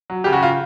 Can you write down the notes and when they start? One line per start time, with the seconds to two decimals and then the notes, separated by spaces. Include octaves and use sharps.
0.10 F#3
0.24 C#3 G4
0.33 F#4
0.43 F4